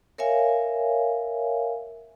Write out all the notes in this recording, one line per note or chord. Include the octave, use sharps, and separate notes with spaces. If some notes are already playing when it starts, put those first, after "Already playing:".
A#4 C#5 E5 F5 G#5